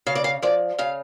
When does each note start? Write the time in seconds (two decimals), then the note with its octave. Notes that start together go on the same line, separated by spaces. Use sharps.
0.07 C#3 F5
0.15 D5
0.24 F5
0.42 F3 D5
0.78 C#3 F5